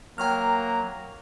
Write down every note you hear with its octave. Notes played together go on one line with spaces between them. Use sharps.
F#3 A#3 G5 A#5 C#6 F6